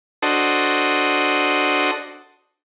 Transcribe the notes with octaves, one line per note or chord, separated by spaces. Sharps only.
D4 F#4 A4 C5 D#5